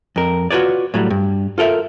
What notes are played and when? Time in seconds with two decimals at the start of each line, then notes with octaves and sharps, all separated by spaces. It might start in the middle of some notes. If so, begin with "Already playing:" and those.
0.16 F2 A#4
0.51 F4 F#4 A#4 B4 C#5 D5
0.94 A2 F#3 G3
1.10 G2
1.58 F4 A4 A#4 E5